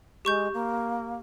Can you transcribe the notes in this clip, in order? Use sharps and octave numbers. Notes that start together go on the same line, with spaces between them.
G#3 G4 C#6 G6
A#3